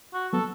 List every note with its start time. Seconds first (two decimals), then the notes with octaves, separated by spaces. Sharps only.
0.13 F#4
0.33 F#3 B3 A4